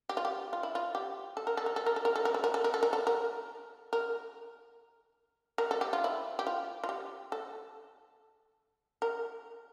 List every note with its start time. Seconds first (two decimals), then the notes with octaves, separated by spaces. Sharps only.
0.09 G4
0.17 F4
0.25 G4
0.53 F4
0.63 E4
0.75 F4
0.95 G4
1.37 A4
1.47 A#4
1.57 A4
1.66 A#4
1.76 A4
1.86 A#4
1.96 A4
2.05 A#4
2.16 A4
2.25 A#4
2.34 A4
2.44 A#4
2.54 A4
2.64 A#4
2.74 A4
2.83 A#4
2.93 A4
3.07 A#4
3.93 A#4
5.58 A#4
5.71 A4
5.81 G4
5.93 F4
6.04 E4
6.39 G4
6.47 F4
6.84 F4
6.89 G4
7.32 A4
9.02 A#4